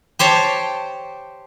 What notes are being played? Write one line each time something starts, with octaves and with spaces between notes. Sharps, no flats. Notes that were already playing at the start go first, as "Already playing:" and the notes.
G4 C5 C#5 A5